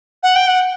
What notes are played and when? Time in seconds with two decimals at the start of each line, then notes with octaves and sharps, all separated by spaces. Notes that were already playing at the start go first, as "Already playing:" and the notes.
0.23 F#5
0.35 G5
0.47 F#5